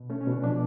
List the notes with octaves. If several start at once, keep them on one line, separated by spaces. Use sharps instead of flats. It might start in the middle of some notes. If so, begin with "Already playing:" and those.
Already playing: B2
A3 C#4
C#4
B2
D4
F3 D4